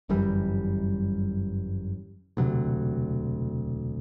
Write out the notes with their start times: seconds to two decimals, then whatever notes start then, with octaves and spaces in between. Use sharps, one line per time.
0.09 G1 F#2 E3 G3
2.37 E1 D2 C3 F#3